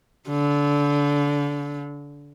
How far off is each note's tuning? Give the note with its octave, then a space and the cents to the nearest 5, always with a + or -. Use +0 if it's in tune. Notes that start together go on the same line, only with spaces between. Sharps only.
D3 -25